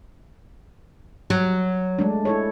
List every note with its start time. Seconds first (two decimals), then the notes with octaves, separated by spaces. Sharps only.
1.30 F#3
1.99 G#3 A3 D4
2.25 E4 A4 C#5